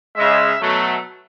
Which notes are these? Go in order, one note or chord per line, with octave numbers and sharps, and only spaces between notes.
C#3 G#3 E5
B2 F#3 A3